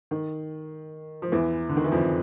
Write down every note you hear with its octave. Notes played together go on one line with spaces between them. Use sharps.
D#3
F3
E2 E3
D3
D#3
E3
F2 F3